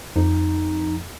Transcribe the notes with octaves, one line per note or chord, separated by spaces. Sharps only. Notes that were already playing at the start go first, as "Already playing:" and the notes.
F2 D#4